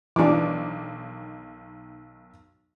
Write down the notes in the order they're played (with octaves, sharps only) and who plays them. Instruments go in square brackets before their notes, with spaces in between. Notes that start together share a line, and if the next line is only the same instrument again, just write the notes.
[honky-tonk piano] B1 D#3 D6 [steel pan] E3 D4